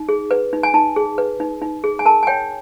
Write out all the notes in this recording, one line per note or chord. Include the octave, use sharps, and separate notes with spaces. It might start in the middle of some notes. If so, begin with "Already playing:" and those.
Already playing: D#4
G#4
B4
D#4
G#5
D#4 A5
G#4
B4
D#4
D#4
G#4
G#5
A#4 A5
G#5
C#5 G5